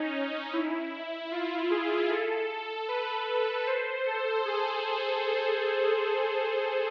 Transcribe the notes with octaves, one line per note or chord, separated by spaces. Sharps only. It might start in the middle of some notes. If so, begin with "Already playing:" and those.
Already playing: C#4 D#4
E4
F4
G#4
A4
B4
C5
A4
G#4